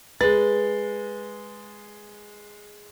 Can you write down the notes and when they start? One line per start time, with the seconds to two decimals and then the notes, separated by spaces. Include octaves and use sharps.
0.21 G#3 B4 A6